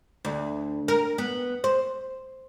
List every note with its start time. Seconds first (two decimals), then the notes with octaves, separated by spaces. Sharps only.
0.25 D2
0.88 A#4
1.18 B3
1.64 C5